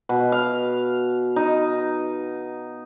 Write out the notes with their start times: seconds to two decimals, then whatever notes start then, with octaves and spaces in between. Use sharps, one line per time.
0.09 B2
0.32 F5
1.36 D#4